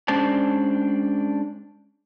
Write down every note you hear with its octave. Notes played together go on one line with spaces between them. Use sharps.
G#3 C#4 D4 C5 D5 A5